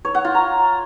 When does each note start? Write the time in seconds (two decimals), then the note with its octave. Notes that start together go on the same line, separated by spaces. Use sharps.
0.05 C#5
0.15 F#5
0.25 F4
0.35 A#5